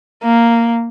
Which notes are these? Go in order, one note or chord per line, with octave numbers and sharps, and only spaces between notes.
A#3